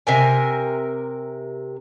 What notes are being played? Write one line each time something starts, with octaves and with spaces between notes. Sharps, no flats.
C3 A#4 G#5